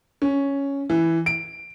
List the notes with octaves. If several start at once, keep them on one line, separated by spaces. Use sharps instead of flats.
C#4
E3
D7